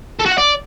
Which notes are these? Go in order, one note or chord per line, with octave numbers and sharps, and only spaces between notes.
A4
F#4
F#5
D5